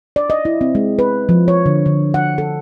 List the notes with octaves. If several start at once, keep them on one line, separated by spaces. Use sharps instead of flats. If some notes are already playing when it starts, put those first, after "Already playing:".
D5
D#5
E4
C4
G#3
B4
F3
C#5
D3
D3
F#5
A4